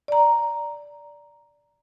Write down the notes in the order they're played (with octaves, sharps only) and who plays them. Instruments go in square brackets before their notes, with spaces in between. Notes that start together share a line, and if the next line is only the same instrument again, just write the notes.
[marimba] D5 A#5